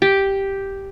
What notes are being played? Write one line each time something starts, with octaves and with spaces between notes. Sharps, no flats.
G4